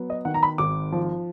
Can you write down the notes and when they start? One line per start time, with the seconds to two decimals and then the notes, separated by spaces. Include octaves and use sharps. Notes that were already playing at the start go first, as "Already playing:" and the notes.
Already playing: F#3 B3
0.10 D#5
0.25 D#3 F#5
0.34 A#5
0.43 B5
0.58 G#1 D6
0.92 F3